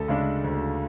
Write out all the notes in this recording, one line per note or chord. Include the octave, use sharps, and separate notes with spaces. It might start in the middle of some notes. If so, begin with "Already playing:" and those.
Already playing: D2 A4
C#3 G#3 D4
D2